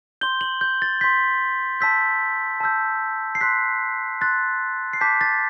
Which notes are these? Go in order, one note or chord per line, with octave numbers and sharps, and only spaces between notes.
C6 G6 G7
F#7
G6
A6
C6 G6 B6
A5 E6 G6 B6
A5 E6 G6
C7
C6 F#6 B6
C6 F#6 A6
C7
A5 D6 G6 B6
A6